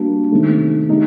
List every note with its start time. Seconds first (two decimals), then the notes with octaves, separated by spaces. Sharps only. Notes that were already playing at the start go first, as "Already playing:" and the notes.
Already playing: G3 A#3 D4 F#4
0.31 C3 D#3 A3 D#4
0.89 A3 D#4 G4